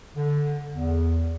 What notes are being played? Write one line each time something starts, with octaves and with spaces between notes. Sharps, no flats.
D3
E2